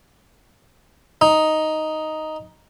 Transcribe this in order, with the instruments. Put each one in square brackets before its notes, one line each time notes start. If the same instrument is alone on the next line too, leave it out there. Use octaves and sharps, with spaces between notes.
[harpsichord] D#4